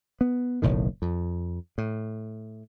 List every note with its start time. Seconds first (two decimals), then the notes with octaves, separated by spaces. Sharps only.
0.21 B3
0.62 F#1 B1 A2 D#3
1.02 F2
1.78 A2